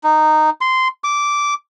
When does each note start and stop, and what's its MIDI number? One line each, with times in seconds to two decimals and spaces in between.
0.04 0.50 63
0.61 0.88 84
1.04 1.54 86